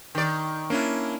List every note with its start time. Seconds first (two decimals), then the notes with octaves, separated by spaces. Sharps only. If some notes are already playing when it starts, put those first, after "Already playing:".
0.15 D#3 D5
0.70 A#3 C#4 D4 E4